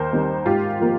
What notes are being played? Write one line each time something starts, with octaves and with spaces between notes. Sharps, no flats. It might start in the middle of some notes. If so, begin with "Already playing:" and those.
Already playing: D#2 A#4 C5
D#3 G3 C4
G#2 F4 G4
F3 A#3